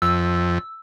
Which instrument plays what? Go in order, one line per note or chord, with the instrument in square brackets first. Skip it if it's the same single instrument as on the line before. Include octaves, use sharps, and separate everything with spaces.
[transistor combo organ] F2 [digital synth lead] E6